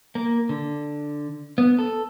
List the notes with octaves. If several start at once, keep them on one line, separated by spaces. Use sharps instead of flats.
A#3
D3
B3
A4